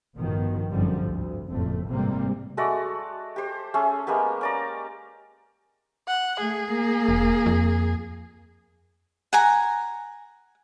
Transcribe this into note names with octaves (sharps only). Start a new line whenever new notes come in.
A1 G2 B2 D#3 F3
G#1 F#2 D3 F3 G3
D2
F#1 F2 A2 F3 A3
A1 G#2 C3 G3 A#3 C4
G#3 A3 F#4 D5
G4 C5
A3 C#4 G#4
G#3 A#3 B3 G4
C#4 D5 A#5
F#5
A3 G#4
A#3
E1
F2
F#5 G#5 A#5